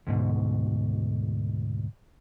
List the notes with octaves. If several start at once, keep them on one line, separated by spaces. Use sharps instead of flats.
D2 G#2 B2